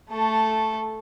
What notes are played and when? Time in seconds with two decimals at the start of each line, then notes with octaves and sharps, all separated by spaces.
0.10 A3 A4